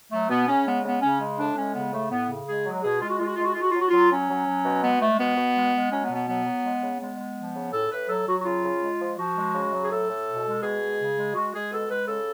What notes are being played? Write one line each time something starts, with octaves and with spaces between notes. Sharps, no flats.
F#3 A3
B2 B3
C#3 C#4
G#3 B3
C#3 B3
C#3 C#4
G#3
A2 D4
G#3 C#4
C#3 B3
A2 A3
A2 B3
C#3
G#3 G#4
F#3
B2 G#4
G#3 F4
F#4
G#3 F4
F#4
G#3 F4
F#4
G#3 F4
F#4
F#3 F4
F#4
F#3 F4
F#3 C#4
F#3
F#3
B2
G#3 B3
G#3 A3
B2 B3
B2
G#3
G#3
F#3 C#4
B3
B2
B3
F#3 B3
F#3
G#3
C#3
G#3 B3
G#3
F3
C#3
A2 A4
A2 B4
F#3 A4
F#3 F#4
F#4
C#3 F4
C#3
G#3
F3
F3 F#4
G#3
C#3
F#3
G#4
A2 A4
A2
B2
G#3
B2 G#4
G#3
C#3
G#3
G#3 F#4
G#3 G#4
B2 A4
G#3 B4
C#3 A4